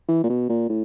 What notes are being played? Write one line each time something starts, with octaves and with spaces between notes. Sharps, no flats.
E3
A#2
B2
A#2
A2